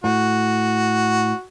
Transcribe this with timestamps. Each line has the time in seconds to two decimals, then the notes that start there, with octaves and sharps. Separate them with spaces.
0.04 A2 F#4